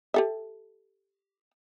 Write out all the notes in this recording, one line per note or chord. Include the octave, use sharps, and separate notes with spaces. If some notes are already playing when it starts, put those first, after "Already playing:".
G4 A4 E5